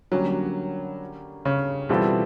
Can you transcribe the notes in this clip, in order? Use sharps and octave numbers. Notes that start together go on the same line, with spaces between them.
D3 F#3 G3 A#3 C#4
C#3
B2 E3 G3 C4 F4 A4